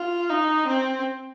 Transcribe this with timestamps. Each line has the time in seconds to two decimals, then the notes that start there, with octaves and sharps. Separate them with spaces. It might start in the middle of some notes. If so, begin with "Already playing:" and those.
Already playing: F4
0.30 D#4
0.67 C4